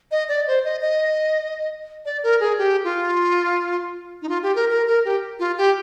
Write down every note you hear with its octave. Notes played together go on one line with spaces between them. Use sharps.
D#5
D5
C5
D#5
D#5
D5
A#4
G#4
G4
F4
D#4
F4
G4
A#4
A#4
A#4
G4
F4
G4